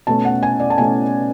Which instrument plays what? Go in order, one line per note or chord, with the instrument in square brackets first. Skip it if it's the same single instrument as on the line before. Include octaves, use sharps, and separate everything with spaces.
[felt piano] B2 A3 C#4 A5
F#5
G#5
D5
A5
B2 A3 C#4 G#5